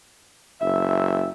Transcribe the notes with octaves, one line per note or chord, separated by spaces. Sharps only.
F#1 E5